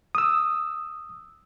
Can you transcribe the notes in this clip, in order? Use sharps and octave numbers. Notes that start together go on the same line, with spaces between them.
D#6 E6